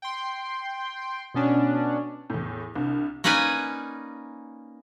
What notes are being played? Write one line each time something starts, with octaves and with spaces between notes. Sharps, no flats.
G5 C6
B2 B3 C#4 D4
E2 A2
C2 D4
A#3 C#4 D#4 B4 D5 G#5